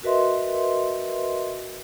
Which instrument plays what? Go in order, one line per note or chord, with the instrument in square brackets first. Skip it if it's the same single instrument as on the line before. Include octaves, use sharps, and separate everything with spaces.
[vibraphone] F#4 A#4 B4 D#5 E5 C6